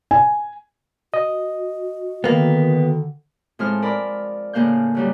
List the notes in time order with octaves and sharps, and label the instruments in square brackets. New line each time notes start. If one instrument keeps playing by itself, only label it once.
[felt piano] G#5
[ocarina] F#4 [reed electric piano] D#5
[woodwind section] D3 D#3 [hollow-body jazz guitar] A#3 B3
[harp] A2 F3 G#3 C4 F6
A#4 D5 B5
A2 C#3 A#3 F5 F#6 G6
C#3 F#3 G3